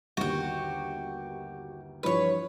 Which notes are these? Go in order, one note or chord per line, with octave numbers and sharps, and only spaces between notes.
G1 D#2 F#4 G4
G2 E3 F3 B4 C#5